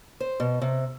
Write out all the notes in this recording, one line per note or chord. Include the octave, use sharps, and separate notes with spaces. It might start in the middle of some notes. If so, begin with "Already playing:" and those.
C5
B2
C3